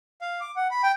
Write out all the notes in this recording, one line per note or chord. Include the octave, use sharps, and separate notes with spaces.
F5
D6
F#5
B5
G5